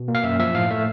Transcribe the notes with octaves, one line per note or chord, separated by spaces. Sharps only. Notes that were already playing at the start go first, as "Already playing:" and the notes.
Already playing: B2
A#3
F5
F#2 E5
F3 E5
A2 F5
A3 E5